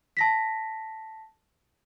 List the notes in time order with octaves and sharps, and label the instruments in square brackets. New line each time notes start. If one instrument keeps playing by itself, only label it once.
[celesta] A5 A#6 B6